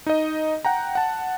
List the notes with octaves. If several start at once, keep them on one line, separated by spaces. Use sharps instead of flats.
D#4 D#5
F#5 G5 A#5
F#5 A5